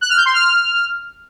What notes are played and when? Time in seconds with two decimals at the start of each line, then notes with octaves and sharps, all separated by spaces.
0.01 F#6
0.09 F6
0.17 G6
0.25 C6
0.34 F6